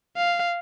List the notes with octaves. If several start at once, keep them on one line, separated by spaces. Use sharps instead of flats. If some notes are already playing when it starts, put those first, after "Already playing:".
F5